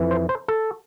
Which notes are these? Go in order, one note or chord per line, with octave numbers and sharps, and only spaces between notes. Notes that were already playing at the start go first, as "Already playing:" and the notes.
Already playing: F2 E3
C5
C5
A4